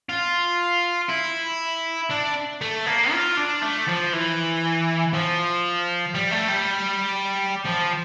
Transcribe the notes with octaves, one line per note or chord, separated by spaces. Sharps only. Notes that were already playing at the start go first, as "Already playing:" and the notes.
F4
E4
D4
A3
A#3
F4
D4
A3
F3
E3
F3
G3
A3
G3
F3